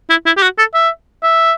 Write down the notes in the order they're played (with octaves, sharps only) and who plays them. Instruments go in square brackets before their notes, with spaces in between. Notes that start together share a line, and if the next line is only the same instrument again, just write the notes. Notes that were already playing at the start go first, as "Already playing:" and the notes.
[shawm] E4
E4
G4
F#4
A4
E5
E5